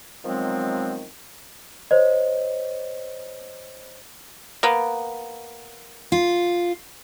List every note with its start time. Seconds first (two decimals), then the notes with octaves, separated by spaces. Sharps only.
0.24 D#3 F3 F#3 G#3 B3 C4
1.91 C5 C#5 D#5
4.63 A#3 B3
6.12 F4